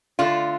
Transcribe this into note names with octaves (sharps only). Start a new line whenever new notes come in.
D3 A3 F4